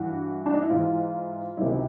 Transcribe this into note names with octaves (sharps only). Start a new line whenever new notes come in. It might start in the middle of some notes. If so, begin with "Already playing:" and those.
Already playing: G2 E3 F#4
D4
D#4
E4
G#2 E3 F4
C#2 C3 D#3 F#3 E4